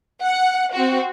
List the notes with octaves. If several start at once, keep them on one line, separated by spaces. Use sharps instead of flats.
F#5
C4 F#4